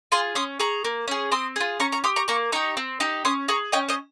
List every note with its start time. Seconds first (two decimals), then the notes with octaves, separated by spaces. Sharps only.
0.12 F4 G#4 G#5 C6
0.35 C#4 C6 D#6
0.60 G#4 A#5 C#6
0.85 A#3
1.08 C#4 G#4
1.32 C4 C6 D#6
1.56 F4 G#4
1.80 C#4 A#5 C#6
1.92 A#5 C#6
2.04 G4 C6 D#6
2.16 A#5 C#6
2.28 A#3 A#5 C#6
2.52 D#4 G4 A#5 C#6
2.77 C4
3.00 D#4 G4
3.25 C#4 C6 D#6
3.48 G#4 A#5 C#6
3.72 C#4 D#5 G5
3.89 C5 D#5